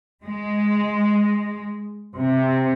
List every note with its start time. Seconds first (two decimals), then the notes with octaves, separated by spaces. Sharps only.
0.25 G#3
2.16 C3